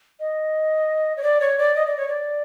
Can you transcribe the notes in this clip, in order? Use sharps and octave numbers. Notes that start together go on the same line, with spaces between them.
D#5
C#5
D5
C#5
D5
D#5
D5
C#5
D5